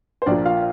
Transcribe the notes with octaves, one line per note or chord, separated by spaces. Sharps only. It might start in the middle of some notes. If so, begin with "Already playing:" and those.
C5
A#1 A#2 D4 D5
F4 F5